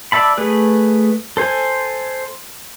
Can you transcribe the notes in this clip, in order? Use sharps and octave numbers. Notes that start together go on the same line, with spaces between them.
D5 E5 A5 B5
A3 G#4 B4
A4 C5 G#5